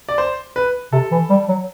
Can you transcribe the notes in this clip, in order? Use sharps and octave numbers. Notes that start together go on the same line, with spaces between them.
D5
C5
B4
C3 A4
E3
G3
F#3